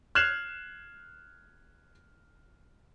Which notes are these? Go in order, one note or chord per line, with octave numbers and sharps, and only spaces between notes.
F6 F#6 G#6 C7 E7 F#7